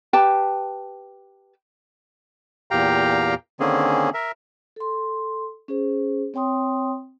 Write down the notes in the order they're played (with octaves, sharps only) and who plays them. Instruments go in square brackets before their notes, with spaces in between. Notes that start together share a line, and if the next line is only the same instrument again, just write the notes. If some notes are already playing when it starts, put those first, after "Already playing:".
[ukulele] G4 B4 G5 A5
[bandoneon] E2 A#2 G4 F5 G5 A#5
D3 D#3 A#3 C4 C#4 G#4
A#4 E5
[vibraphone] A4 C6
C#4 G#4 C5
C4 C#5 G5 C6 D#6